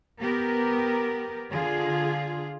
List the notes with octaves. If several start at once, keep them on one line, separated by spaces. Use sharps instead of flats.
B3 G4 A#4
D3 F4 G#4